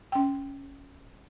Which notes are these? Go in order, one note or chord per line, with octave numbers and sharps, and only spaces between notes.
C#4 G5